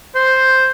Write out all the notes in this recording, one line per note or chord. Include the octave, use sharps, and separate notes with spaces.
C5